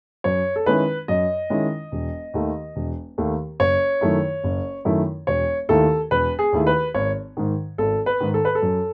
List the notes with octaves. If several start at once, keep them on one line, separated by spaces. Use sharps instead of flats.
F#2 C#5
A4
D#3 G#3 C#4 E4 B4
F#2 D#5
D#3 G#3 C#4 E4
E1
D#2 D#3 A3
E1
D#2 D#3 A3
F#1 C#5
F#2 D#3 A3 E4
F#1
F#2 D#3 A3 E4
E1 C#5
D#2 D#3 A3 E4 A4
E1 B4
G#4
D#2 D#3 A3 E4
B4
G#1 C#5
G#2 D#3
G#1 A4
B4
G#2 D#3
A4
B4
A4
F#2